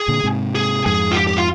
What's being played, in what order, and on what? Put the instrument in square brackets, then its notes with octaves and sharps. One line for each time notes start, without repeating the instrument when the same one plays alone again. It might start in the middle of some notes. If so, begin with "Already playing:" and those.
Already playing: [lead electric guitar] G#4
[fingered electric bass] A#2 D3
G#2 C3
[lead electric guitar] G#4
[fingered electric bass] F2 G#2 [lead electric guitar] G#4
[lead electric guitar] F4
G4
G4
F4